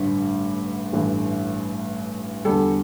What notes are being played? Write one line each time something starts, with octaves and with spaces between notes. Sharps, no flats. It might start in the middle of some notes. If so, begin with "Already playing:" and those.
Already playing: A1 G2 D3 G3
A1 G2 E3 A3
E2 D3 G3 A4